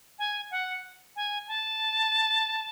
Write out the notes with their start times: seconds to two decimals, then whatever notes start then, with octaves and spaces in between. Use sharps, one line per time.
0.19 G#5
0.51 F#5
1.16 G#5
1.48 A5